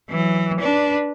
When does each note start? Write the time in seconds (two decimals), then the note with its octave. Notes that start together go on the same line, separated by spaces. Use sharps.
0.10 E3 F#3
0.60 D4 B4